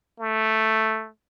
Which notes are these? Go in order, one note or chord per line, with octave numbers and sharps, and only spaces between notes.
A3